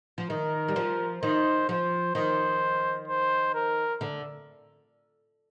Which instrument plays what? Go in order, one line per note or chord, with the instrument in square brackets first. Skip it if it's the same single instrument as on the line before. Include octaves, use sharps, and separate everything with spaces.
[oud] F3
[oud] D#3 [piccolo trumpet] A#4
[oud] G3
F3
[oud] D#3 [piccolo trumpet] C5
[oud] F3 [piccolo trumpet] C5
[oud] D#3 [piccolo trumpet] C5
[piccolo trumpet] C5
A#4
[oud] D3